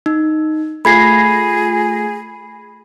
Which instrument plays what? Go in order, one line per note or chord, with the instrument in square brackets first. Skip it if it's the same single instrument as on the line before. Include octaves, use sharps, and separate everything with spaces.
[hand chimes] D#4
[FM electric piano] A3 F4 A#6 [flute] G#4 [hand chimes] B5 G#6 C7